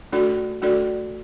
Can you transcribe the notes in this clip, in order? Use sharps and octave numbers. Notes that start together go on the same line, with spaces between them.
A3 D4 F#4 A4 D5
A3 D4 F#4 A4 D5